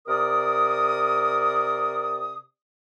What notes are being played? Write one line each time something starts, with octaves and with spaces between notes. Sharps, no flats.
C3 A#4 D5 D#6